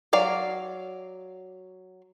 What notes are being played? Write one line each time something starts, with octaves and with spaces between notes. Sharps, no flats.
F#3 D5 F5